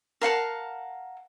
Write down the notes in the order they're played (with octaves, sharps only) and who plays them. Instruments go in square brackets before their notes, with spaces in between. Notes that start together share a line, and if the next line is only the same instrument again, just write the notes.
[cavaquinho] A#4 F5 F#5 A5